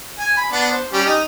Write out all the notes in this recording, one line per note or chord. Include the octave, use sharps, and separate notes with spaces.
G#5
B5
B3 D4 F#5
C5
G3 C#4 G4
D#4